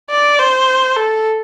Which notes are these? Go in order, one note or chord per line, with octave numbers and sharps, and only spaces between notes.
D5
C5
A4